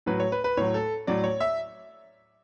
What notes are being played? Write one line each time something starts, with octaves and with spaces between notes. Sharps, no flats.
A2 F#3 B4
C#5
B4
B4
A2 F#3 C#5
A4
A2 F#3 D5
C#5
E5